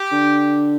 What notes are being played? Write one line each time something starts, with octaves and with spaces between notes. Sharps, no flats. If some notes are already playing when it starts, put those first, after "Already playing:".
Already playing: G4
D3